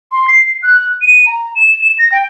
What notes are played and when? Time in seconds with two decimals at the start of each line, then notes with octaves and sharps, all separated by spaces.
0.12 C6
0.28 C7
0.63 F#6
1.02 D#7
1.26 A#5
1.55 E7
1.81 E7
1.99 A#6
2.12 G5